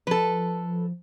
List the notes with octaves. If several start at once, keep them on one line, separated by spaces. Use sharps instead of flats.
F3 A4 B4